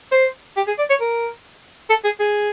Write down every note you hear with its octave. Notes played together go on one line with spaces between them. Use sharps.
C5
G4
G#4
D5
C#5
A#4
A4
G#4
G#4